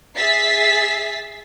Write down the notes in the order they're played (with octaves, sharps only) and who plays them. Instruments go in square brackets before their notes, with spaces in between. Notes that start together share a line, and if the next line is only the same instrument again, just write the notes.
[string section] G#4 E5 A6 B6 C7